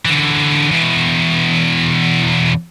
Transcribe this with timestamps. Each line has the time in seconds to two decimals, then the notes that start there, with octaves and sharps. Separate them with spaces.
0.05 D3 E3
0.71 E2 B2